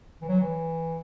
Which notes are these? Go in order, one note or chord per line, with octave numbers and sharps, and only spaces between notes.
E3
F#3
E3